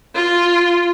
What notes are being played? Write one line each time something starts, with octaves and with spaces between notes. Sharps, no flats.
F4